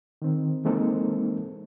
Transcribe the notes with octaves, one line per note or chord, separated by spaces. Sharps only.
D#3 C4
E3 G#3 A#3 C4 D#4 A4